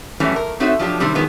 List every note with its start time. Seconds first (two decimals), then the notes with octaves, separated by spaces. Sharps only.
0.20 F#2 A2 E3 G3 C#4 F#4
0.36 A#4
0.60 A3 C4 D#4 F#4 C#5 E5
0.79 F3 F#3 D4 G4
1.00 C3 D#3 F#3 G3 C4
1.15 B2 D#3 F3 F#3 G#3 B3